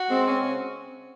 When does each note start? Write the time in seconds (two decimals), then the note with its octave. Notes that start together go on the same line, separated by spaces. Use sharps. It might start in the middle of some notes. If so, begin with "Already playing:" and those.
Already playing: F#4
0.10 G#3 C4
0.27 C#4
0.43 C#3